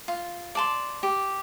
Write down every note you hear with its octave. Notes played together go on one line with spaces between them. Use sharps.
F4
D5 A5 C6
G4